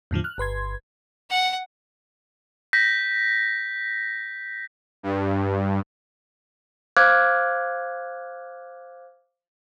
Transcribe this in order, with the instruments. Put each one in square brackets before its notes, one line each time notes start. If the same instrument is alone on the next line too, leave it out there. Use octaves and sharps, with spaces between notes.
[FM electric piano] E2 A2 D3 F3
F6 F#6
G1 B4 C6 G#6
[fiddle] F#5
[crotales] G6 A#6 B6
[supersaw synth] G2
[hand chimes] C5 F5 D6 F6 F#6 G#6